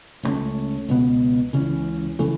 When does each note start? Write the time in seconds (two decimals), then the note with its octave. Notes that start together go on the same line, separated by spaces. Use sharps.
0.23 C#2 C#3 A3 C#4
0.89 C#2 B2 B3
1.53 C#2 C#3 E3 C#4
2.19 C#3 E3 A3